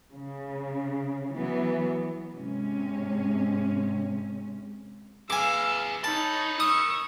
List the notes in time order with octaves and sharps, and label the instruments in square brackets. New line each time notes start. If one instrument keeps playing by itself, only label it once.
[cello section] C#3
E3 F#3 B3
G#2 C3 G#3 C#4
[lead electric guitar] G#4 B4 [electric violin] F5 E6 [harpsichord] G#5 D6
[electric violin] D#4 C#5 [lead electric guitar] A#4 B5 [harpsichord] A5
[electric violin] C#6 E6 [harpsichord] D#6